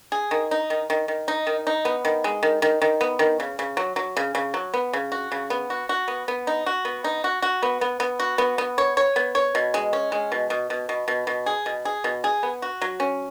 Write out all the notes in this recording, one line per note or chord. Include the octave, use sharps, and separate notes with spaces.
G#4
D#3
D#4
D#3
D#3
D#3
D#4
D#3
D#4
B3
D#3
G#3
D#3
D#3
D#3
B3
D#3
C#3
C#3
F#3
F#3
C#3
C#3
F#3
B3
C#3
F#4
C#3
B3
F#4
F#4
B3
B3
D#4
F#4
B3
D#4
F#4
F#4
B3
B3
B3
F#4
B3
B3
C#5
C#5
B3
C#5
B2
G#3
C#4
G#3
B2
B2
B2
B2
B2
B2
G#4
B2
G#4
B2
G#4
B3
F#4
F#3
C#4